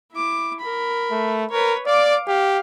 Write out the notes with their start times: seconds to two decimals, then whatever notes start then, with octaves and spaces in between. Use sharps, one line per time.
0.13 E4 D6
0.60 A#4 B5
1.11 A3
1.51 A#4 B4 C#5
1.87 D5 F5 D6
2.27 G4 F5